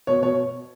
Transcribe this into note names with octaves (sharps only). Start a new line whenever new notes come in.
B2 C#5
B2 C#5